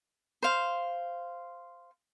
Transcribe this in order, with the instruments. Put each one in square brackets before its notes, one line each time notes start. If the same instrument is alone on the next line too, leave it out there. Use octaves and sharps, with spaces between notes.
[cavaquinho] C5 F5